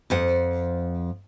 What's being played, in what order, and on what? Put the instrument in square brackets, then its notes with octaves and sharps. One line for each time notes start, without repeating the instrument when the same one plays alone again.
[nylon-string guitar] F2 F3 F#5